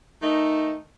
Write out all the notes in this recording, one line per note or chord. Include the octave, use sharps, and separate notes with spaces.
D#3 A3 D#4